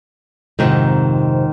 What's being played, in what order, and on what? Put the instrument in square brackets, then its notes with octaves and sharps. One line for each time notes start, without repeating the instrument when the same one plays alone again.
[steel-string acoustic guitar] F2 C3 C4 [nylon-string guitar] G#2 D#3